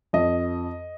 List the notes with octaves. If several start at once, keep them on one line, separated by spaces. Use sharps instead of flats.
F2 D#5